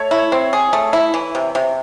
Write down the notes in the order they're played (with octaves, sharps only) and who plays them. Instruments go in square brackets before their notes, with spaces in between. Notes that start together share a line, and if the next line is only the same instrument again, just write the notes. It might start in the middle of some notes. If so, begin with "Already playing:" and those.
Already playing: [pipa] A3 [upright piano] C#5
[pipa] E4
C4
G#4
A3
E4
E3
C3
C3